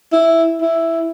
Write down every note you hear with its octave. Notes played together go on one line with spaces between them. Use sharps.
E4
E4